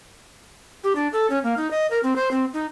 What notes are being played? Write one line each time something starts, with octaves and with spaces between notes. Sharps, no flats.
G4
D4
A4
C#4
A#3
D#4
D#5
A#4
C4
C5
C4
D#4